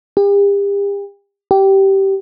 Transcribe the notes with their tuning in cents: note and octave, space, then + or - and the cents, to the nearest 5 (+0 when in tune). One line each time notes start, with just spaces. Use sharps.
G4 +40
G4 -15